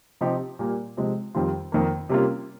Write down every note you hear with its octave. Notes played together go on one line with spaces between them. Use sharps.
C3 F3 C4 D#4 G4
A#2 G3 A#3
C3 F3 G#3
F2 D#3 G3 C4 F4
F2 D#3 A#3
C3 G3 A#3 C#4 F4